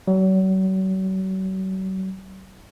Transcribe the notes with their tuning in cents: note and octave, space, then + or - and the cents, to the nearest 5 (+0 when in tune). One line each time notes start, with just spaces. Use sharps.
F#3 +40